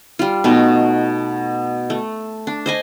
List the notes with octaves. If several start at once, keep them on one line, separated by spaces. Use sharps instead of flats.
G3 F4
B2 A3 D#4
A3
D4
C5 D#5 G#5